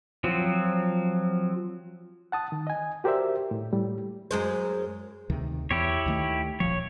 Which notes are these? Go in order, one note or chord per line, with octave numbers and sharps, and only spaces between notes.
F3 F#3 C4
F#5 A5 D#6
D#3
D#5 G#5
F#4 G4 A#4 C5 D5 E5
A2
A2 G3
F#2 G#3 C5
D2 C3 D#3
E2 E4 G4 C#5
D2 D#3 A3
E1 A#1 F3 C#5